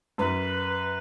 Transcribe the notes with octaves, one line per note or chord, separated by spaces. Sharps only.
F#2 B4